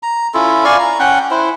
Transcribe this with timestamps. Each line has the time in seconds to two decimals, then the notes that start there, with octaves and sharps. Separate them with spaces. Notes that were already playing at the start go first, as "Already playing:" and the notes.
0.03 A#5
0.34 C#4 E4 F4 A4
0.65 D5 F5 G#5 C#6
0.79 A#5
0.99 C#4 F#5 G5
1.31 E4 C5